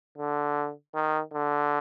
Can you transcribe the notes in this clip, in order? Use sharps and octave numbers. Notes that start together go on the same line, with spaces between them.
D3
D#3
D3